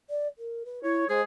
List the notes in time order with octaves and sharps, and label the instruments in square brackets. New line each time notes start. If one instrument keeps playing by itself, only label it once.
[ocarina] D5
A#4
B4
[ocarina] E4 [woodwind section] C#5
[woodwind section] G#3 G#4 [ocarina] C5